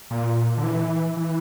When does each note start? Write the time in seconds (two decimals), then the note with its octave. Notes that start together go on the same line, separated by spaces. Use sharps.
0.11 A#2
0.57 D3
0.63 E3
1.17 E3